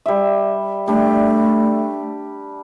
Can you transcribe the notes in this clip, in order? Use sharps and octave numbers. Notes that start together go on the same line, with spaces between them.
G3 E5
G3 A3 D4